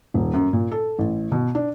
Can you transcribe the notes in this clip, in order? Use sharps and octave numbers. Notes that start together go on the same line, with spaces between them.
D#1
F#2
A#2
A4
A1
B2
D4